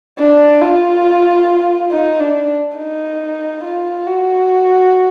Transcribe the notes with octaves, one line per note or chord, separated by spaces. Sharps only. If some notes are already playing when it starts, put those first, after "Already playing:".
D4
F4
D#4
D4
D#4
F4
F#4